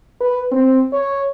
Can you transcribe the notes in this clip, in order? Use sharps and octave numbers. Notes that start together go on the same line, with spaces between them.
B4
C4
C#5